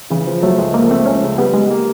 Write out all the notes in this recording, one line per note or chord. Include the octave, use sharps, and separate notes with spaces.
C#3 E3
F3
F#3 A3
C#2 G#3
F3 A#3
A3 C4
C#2 C#4
C#3
G3 B3
G3 G#3
A#3